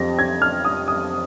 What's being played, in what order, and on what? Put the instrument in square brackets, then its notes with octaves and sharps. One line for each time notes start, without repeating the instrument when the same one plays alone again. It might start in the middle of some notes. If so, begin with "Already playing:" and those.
Already playing: [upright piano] F2 C3 A#6
G#6
F6
D#6
D#6